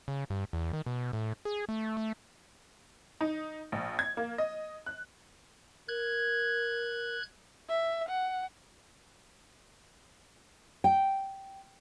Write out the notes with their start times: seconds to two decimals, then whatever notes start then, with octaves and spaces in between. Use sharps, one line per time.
0.08 C#3
0.30 G2
0.53 E2
0.73 D#3
0.86 B2
1.13 A2
1.45 G#4
1.69 A3
1.97 A3
3.21 D#4
3.72 A#1
3.99 G#6
4.17 A#3
4.38 D#5
4.86 F#6
5.88 A#4 F#6 G#6
7.69 E5
8.09 F#5
10.84 G5